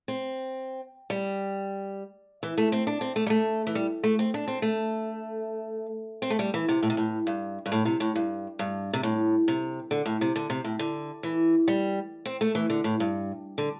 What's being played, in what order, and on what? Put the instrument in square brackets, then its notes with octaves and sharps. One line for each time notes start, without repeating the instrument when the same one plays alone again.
[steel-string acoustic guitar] C4
G3
E3
A3
C4
D4
C4
A3
G3
A3
E3
G3
A3
C4
D4
C4
A3
C4
A3
G3
E3
C3
A2
C3
A2
G2
G2
A2
C3
A2
G2
G2
C3
A2
C3
D3
A2
C3
D3
C3
A2
D3
E3
G3
C4
A3
E3
D3
A2
G2
D3